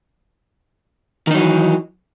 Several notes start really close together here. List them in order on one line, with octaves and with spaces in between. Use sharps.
D#3 D#4 F#3 E3